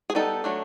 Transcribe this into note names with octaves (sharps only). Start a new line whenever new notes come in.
G#4
G3 B3 D#4 A4
F#3 A3 D4